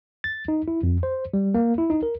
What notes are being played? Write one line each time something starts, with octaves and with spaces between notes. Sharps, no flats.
A6
D#4
E4
F2
C5
G3
A#3
E4
D#4
A#4